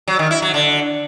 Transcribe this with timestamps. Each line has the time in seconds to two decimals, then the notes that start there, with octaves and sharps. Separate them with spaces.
0.08 F#3
0.19 D#3
0.31 E4
0.42 F#3
0.54 D3